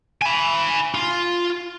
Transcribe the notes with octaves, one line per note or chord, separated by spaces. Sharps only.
G#5 B5
F4